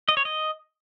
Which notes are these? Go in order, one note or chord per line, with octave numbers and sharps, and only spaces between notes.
D#5
C#5
D#5